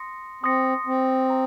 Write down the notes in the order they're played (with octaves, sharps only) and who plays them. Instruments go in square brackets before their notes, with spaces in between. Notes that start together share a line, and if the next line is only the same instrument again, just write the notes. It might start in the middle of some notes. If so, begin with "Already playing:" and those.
Already playing: [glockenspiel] C6 D#6 A#6 C#7
[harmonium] C4 [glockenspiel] C6 D#6 A#6 C#7
[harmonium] C4
[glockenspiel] A#5